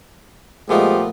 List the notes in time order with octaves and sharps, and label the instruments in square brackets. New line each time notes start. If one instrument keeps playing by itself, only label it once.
[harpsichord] A#2 A3 B3 [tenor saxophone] F3 [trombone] G#3 [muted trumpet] G4